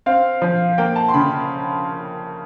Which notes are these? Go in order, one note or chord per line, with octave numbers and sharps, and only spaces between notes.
C4 F5
F3
A#3 G5
A5
C6
C#3 B5